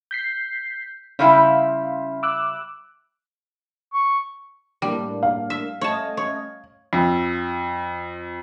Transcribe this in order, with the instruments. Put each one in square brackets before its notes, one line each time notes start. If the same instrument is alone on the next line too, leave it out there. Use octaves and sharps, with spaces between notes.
[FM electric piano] G6 B6 C7
[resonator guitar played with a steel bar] C#3 G3 E4 [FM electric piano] C#4 F5 C6
[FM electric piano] D6 E6 F#6
[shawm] C#6
[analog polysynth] A2 A#3 D4 [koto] G3
[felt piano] F5
[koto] E5
[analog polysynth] A3 C#4 D#5 [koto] C#5 A5
[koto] C#5
[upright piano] F2